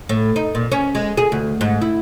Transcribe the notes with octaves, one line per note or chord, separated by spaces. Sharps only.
A2
D#4
A#2
C#4
G#3
G#4
D2
G#2
E4